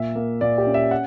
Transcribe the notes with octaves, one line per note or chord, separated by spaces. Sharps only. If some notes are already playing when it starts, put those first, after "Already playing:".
Already playing: A#2 E5
A#3
A#2 D5
G4
C#4
E5
F#5